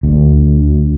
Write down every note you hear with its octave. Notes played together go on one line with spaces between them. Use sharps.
D2